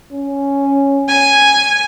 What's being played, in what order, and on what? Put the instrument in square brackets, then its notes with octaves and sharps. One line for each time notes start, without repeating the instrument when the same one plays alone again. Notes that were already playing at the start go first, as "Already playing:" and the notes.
[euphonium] C#4
[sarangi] G#5